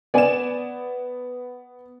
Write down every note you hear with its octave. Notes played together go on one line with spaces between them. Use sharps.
B3 D5 G#5 E7